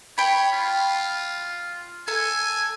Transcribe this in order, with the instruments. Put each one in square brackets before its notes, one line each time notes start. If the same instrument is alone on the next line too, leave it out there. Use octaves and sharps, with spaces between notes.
[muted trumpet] C#5 [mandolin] G5 B5
[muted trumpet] F4
[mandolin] A4 [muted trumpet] G#5